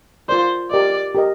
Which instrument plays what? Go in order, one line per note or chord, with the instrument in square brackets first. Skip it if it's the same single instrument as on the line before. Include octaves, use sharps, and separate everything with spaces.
[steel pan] F4 A#4 D5 [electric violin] C5
[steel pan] G4 A#4 D#5 [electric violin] D5
[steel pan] G4 A#4 D#5